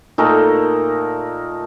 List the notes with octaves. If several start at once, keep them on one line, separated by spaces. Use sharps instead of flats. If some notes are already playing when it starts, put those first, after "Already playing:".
A#2 A3 D#4 A#4